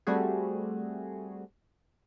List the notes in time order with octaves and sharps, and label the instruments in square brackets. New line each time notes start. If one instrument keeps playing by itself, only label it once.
[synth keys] G3 A3 C4 F#4 G#4